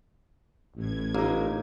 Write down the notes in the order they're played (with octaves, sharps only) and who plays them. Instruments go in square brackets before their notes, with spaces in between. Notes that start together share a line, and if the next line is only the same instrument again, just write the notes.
[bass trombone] A1 [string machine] A2 G#6
[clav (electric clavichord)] G1 [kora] A#3 D#4